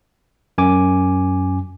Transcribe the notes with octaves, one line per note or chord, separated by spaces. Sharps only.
F#2 G#5 D6